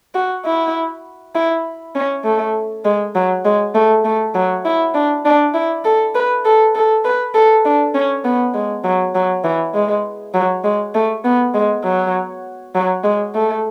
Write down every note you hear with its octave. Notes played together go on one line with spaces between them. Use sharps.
F#4
E4
E4
C#4
A3
G#3
F#3
G#3
A3
A3
F#3
E4
D4
D4
E4
A4
B4
A4
A4
B4
A4
D4
C#4
B3
G#3
F#3
F#3
E3
G#3
F#3
G#3
A3
B3
G#3
F#3
F#3
G#3
A3